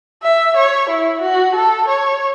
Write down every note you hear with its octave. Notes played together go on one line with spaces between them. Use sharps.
E5
C#5
E4
F#4
A4
C#5